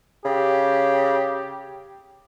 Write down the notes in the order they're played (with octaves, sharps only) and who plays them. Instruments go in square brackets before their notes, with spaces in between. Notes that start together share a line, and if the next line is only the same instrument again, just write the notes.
[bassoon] C#3 [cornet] G4